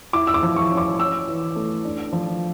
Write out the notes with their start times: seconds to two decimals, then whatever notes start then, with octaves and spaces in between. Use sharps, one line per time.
0.13 E4 D6
0.27 E6
0.34 D6
0.43 F3
0.56 C#6
0.71 C#4
0.77 D6
0.99 C#4 E6
1.27 E3
1.56 A3
1.85 D4
2.13 F3